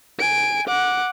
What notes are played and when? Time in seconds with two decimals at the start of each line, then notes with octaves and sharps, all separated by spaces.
0.19 G#5 D7
0.67 F#5 D6